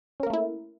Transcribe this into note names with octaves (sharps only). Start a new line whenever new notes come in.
A3 A#3 C#4 E4 A#4